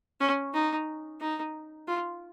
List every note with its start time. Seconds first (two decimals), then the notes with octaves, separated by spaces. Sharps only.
0.20 C#4
0.54 D#4
1.20 D#4
1.87 F4